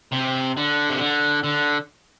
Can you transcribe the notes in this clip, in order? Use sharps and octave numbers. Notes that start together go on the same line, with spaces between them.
C3
D3
C3
D3
D3